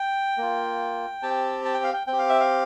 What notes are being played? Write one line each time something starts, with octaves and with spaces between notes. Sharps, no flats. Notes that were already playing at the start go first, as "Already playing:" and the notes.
Already playing: G5
A#3 F4
C4 G4 A5
A5
G5
F5
G5
C4 G5
G4
F5
E5
F5